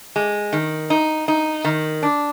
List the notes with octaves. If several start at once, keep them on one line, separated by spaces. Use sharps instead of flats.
G#3
D#3
D#4
D#4
D#3
D4